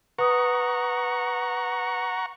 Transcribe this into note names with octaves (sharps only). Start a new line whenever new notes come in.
B4 F#5 A#5 C#6 D#6